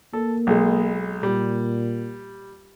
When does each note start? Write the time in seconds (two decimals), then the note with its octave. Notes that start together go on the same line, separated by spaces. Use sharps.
0.13 A#3 A4
0.47 B1 G#3
1.23 A#2 G3